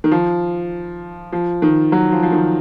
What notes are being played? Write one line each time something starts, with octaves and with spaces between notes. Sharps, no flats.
D#3
F3
F3
D#3
F#3
F3
F3
D#3